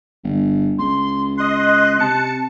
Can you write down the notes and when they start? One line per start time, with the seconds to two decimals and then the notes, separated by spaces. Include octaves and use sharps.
0.24 G1
0.78 C#2 C6
1.37 D#5 C6 F#6
1.99 C3 A5 C#7